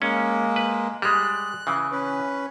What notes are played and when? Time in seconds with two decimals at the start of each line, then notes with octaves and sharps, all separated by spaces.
0.02 G#3 A#3 C#4
0.56 B4
1.02 G3 G#3 F#6
1.67 C#3 E3
1.91 C#4 B4